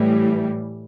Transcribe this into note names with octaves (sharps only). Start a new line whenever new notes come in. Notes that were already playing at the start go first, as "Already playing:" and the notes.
Already playing: A2 E3 G3